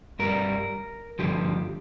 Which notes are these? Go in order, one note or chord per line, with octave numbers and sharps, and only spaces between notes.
G2 G3 A#4
G2 D3 F3 G4